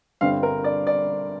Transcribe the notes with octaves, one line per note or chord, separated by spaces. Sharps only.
G1 G2 D3 G3 C4 F5
A#4
D5
D5